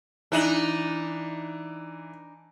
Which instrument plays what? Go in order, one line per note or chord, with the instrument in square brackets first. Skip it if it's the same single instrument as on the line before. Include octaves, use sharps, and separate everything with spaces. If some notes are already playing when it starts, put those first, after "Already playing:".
[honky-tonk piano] E3 F#7 [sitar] D4 D#4